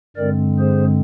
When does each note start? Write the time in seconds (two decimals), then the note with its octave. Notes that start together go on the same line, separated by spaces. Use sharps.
0.16 G2 D3 G#3 C4 A#4 D5
0.59 G#4 C5